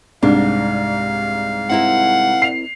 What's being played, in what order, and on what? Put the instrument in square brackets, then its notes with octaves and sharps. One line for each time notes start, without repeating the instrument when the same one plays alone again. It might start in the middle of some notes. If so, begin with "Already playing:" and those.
[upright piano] C2 G#2 [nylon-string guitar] D4 [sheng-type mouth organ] F5
[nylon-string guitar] C4 E4 A#4 [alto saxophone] F#5
[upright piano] C7 F7